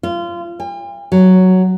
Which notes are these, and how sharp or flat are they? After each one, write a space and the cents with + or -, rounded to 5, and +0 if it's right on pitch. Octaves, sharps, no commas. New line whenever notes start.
F4 -25
G5 +45
F#3 +5